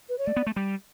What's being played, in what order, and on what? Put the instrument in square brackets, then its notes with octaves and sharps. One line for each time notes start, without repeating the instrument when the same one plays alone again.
[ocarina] B4
C#5
[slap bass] A3 [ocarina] D5
[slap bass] B3
A3
G3